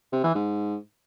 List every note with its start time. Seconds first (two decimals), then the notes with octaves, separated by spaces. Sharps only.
0.12 C3
0.24 E3
0.35 G#2